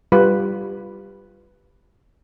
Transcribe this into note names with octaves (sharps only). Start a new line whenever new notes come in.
G3 F4 B4